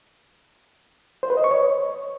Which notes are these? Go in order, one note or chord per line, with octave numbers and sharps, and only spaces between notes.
C5
B4
D#5
C#6
C#5